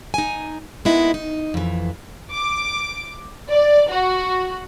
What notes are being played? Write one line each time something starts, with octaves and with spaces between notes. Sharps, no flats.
D#4 G#5
G#3 A#3 B3 D#4 E4
D#4
F2 E3
D6
D5
F#4